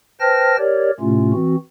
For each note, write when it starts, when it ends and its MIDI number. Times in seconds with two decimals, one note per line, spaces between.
0.20 0.57 71
0.20 0.57 72
0.20 0.57 79
0.20 0.57 81
0.20 0.57 89
0.20 0.57 94
0.58 0.90 67
0.58 0.90 70
0.58 0.90 73
0.58 0.90 74
1.00 1.32 45
1.00 1.32 48
1.00 1.32 57
1.00 1.32 61
1.00 1.32 65
1.33 1.56 52
1.33 1.56 60
1.33 1.56 66